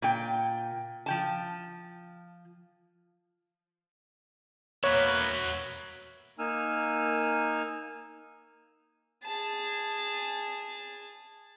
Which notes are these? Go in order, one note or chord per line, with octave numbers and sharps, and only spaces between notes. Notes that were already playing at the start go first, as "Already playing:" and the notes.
A#2 G5
F3 G5 A5
A#3 B3 F#4 B4 C#5 E5
A#3 D#4 G#5 E6 F6
G#4 A5